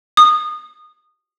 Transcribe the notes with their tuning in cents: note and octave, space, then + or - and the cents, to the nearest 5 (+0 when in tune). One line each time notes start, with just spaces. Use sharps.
D#6 -20